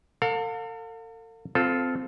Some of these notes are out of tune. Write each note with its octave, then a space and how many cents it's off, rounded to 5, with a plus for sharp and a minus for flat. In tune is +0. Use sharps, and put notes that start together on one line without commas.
A4 +45 F5 +35
C4 -15 F4 +0 A4 -5